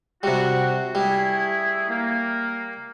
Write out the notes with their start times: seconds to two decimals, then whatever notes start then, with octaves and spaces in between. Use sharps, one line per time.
0.23 C3 G3 F#4
0.95 G3 A3 E4 G#4
1.89 A#3